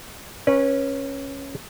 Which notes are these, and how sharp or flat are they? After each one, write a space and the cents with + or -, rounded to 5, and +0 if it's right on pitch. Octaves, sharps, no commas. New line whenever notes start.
C#4 -10 B4 -25